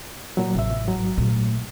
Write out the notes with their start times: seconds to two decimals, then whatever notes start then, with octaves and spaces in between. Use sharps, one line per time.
0.37 A#2 F#3
0.55 A1 C3 E5
0.84 G#2 F#3
1.18 A#2 A3